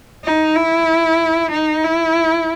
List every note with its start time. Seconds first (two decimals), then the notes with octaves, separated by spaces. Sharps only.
0.25 D#4
0.56 E4
1.52 D#4
1.84 E4